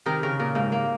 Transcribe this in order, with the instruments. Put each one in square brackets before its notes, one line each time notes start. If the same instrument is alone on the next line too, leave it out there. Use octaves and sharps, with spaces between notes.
[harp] C3 D#3 [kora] A#4
[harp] C#3 [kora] A#4
[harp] A#2 [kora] A#4
[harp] G#2 [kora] A#3
[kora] A#3